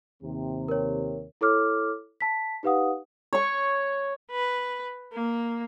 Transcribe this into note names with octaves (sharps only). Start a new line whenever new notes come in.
D#2 C3
A#4 C#5
E4 A4 C#5 D6 F6
A5 B6
D#4 G4 B4 F5 F#5 D#6
C#5 C#6
B4
A#3